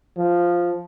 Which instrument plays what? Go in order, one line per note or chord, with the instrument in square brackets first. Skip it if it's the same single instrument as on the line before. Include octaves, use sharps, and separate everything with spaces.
[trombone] F3